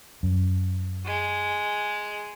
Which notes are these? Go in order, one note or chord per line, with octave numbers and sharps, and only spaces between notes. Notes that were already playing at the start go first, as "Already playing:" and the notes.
F#2
G#3